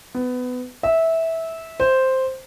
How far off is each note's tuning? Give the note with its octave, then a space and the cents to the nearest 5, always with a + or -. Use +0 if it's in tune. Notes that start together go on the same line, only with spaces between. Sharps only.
B3 +20
E5 -15
C5 +0